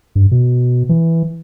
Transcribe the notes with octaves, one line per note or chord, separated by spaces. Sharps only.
G2
B2
E3